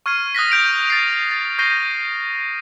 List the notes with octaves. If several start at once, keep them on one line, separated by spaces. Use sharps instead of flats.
C#6 F6 G#6 C7 D#7
D#6 F#6 A#6 B6
G6 D7 F7
A6 C7
A6
C#6 G6 A#6 C7 D#7 G7